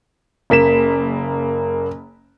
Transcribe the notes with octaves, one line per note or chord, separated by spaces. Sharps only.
F#1 A#3 B6 E7